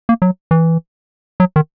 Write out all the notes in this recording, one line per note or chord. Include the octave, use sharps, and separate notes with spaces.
A#3
F#3
E3
F#3
D#3